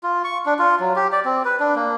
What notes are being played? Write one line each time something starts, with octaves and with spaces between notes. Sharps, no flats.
F4
C#6
D4
F4
F#3
G4
D5
C4
B4
D4
A#3